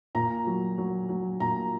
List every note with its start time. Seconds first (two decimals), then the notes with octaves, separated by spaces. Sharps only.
0.15 A#2 A#5
0.47 F#3
0.78 F#3
1.09 F#3
1.40 A#2 A#5